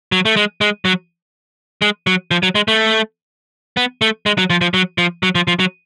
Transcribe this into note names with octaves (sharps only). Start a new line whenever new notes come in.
F#3
A3
G#3
G#3
F#3
G#3
F#3
F3
F#3
G#3
A3
B3
A3
G#3
F#3
F3
F3
F#3
F3
F#3
F3
F3
F#3